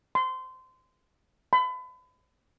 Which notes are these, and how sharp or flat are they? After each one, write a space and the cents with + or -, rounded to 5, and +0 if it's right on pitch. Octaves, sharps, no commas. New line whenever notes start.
C6 -20
B5 +35